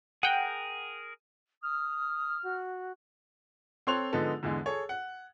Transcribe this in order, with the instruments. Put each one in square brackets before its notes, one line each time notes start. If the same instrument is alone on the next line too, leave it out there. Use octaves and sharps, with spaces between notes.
[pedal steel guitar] G#4 A#4 [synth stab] F#5 G5
[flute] D#6 [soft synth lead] F6
[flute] F#4
[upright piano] C4 A4 C#5 C6 F#6 F7
D3 F3 G#3 B3 D#4 A4
E2 D3 E3 G#3
G#4 A4 C#5
F#5